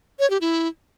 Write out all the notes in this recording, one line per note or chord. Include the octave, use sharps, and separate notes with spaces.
C#5
G4
E4